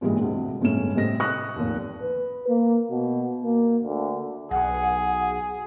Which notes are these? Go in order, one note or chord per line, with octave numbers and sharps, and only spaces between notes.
G2 A#2 E3 G3 G#3
D2 C3
G1 A2 G#3 A3 C#4 E7
A2 C3 G3 C4 D#5 A#6
C#6 D#6 F#6 A#6
F1 D#2
B4
A#3
B2
A#3
D2
B1 G#4 F#5